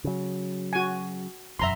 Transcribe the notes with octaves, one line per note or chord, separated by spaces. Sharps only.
C#3 F#3
F#4 G#5
E1 F#2 E5 A#5 C6